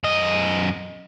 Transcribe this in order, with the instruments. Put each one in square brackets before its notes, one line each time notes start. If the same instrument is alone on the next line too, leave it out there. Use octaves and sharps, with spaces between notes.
[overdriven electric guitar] F#2 D#5